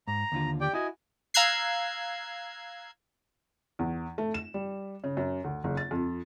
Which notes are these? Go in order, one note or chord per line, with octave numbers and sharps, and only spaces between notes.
G#2 A#5
D#2 D3 F4
G4 D5 G5
E4 F#4 D#5 G#5
F5 A#5 E6 F#6 G#6 C7
E2
A3
E7
G3
C#3
F#2
D2
F#1
A6
F2